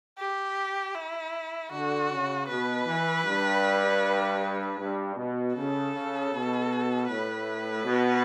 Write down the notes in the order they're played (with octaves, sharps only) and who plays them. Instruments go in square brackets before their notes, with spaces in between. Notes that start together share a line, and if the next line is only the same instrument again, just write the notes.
[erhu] G4
E4
[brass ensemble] D3 [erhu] F#4
[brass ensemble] C#3
[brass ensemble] B2 [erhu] B4
[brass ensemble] E3
G2
G2
B2
[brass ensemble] C#3 [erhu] A4
[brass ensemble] C#3
B2
[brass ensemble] A2 [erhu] B4
[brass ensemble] B2